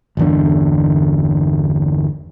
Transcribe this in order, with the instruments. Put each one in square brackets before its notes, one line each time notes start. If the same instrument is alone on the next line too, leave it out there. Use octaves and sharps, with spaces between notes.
[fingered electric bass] G1 E2 D3